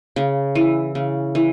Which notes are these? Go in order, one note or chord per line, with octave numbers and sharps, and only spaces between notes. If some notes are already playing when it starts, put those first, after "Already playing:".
C#3
E3
C#3
E3